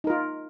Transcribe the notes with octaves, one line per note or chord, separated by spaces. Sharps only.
D#4 F4 A#4